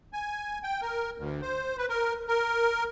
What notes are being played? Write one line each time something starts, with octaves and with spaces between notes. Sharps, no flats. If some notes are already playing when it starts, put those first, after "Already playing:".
G#5
G5
A#4
D2
C5
B4
A#4
A#4